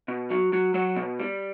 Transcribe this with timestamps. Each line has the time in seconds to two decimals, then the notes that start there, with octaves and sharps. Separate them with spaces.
0.08 B2
0.30 F#3
0.53 F#3
0.74 F#3 C#5
0.96 B2
1.19 G3